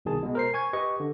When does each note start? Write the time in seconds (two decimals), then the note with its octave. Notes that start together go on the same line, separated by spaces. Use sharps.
0.05 C2 B2 D#3 G#4 A5
0.22 B2 G#3
0.35 A#4 C5 C7
0.54 G#5 C#6 G#6
0.73 G4 B4 D#5 C#6
1.00 D3